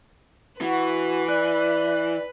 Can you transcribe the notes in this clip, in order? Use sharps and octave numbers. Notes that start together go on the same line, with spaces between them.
E3 F#4 B4
D5 F#6